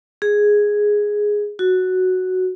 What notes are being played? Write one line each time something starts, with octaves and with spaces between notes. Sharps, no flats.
G#4
F#4